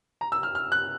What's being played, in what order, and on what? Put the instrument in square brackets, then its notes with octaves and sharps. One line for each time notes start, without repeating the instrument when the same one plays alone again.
[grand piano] A#5
E6
F6
F6
F#6